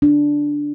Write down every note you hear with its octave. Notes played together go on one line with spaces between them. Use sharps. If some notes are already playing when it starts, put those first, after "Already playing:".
D4